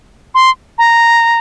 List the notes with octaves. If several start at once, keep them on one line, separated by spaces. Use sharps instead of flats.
C6
A#5